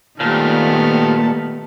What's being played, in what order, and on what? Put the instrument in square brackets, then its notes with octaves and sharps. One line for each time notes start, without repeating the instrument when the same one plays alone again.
[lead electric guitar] A#2 [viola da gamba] D#3 A3 B3 [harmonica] G3 A5 F6